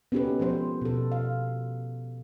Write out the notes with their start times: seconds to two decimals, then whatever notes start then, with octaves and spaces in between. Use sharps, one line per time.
0.12 B3 C#4 D#4 G4 A4 B4
0.40 F3 G#3 B3 C5
0.82 B2 A4
1.12 F5